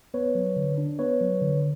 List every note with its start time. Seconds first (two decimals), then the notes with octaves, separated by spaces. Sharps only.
0.14 B3 B4 C#5
0.35 F#3
0.57 D3
0.78 D4
0.99 B3 B4 C#5
1.21 F#3
1.42 D3